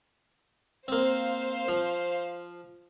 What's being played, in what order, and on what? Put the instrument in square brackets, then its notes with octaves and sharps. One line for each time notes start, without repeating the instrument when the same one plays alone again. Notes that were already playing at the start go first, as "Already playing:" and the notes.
[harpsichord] A#3 C4 [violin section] C5 F5
[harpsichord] F3